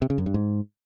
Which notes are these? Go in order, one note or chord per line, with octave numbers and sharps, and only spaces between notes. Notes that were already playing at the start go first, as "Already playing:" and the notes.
C3
C#3
F#2
G2
G#2